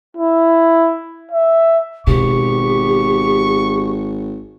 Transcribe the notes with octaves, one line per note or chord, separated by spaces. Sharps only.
E4
E5
G#1 B2 G4 C#6